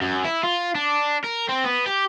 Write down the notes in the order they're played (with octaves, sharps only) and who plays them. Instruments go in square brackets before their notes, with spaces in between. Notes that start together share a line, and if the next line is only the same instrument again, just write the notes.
[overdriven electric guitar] F#2
E4
F4
D4
A#4
C4
B3
G4